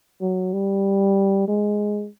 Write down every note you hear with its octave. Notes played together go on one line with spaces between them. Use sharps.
F#3
G3
G#3